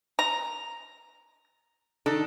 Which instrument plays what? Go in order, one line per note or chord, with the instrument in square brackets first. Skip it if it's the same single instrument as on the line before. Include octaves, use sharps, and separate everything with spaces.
[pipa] A#5
[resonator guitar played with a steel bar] D#3 D4 A4